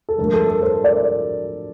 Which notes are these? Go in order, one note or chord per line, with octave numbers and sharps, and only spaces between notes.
A4
G2 D3 F3 A3 A#4
A4
A#4
A4 C5
A#4 D5